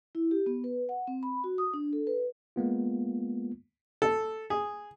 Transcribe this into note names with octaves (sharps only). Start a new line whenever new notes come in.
E4
G4
B3
B4
F#5
C4
B5
F#4
D#6
D4
A4
B4
G#3 A#3 B3 F4
A4
G#4